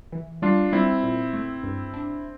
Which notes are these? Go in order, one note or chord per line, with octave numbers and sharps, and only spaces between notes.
E3
G3 D4 F4
G3 C4 E4
A#2
A3
G2
D4